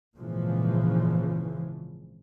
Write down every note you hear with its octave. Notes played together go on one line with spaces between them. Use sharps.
G#1 A#2 C#3 E3 F3